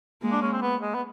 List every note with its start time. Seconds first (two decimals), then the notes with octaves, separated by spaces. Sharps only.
0.22 G#3 A#3
0.32 D4
0.42 C#4
0.53 C4
0.62 B3
0.82 G#3
0.95 B3